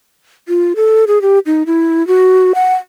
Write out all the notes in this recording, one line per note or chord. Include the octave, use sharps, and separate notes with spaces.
F4
A4
G#4
G4
D#4
E4
F#4
F#5